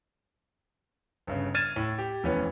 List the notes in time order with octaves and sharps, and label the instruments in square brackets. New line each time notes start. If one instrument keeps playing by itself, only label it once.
[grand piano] G1 C#3
F6 G#6 A6 D#7 E7
A2
G4
F1 E3 B3 C#4